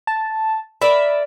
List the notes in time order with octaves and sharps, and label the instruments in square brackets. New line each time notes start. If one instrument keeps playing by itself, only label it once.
[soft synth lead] A5
[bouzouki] A#4 D5 E5 [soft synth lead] B5